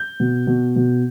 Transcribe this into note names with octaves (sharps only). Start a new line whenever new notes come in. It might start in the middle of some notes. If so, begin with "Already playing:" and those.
Already playing: G6
B2
B2
B2